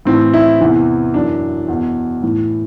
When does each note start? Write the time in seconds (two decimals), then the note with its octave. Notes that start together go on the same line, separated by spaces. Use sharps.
0.05 A2 E3 C4
0.34 E4
0.61 E2 C3 E3
1.14 F#2 E3 D4
1.68 E2 B2
2.22 A2 E3